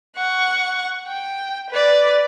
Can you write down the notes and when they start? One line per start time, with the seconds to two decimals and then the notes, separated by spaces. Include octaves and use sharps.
0.17 F#5 C#6
1.08 G5
1.70 B4 D5